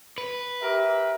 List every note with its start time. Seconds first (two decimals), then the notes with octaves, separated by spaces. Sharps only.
0.18 B4
0.62 G4 A#4 E5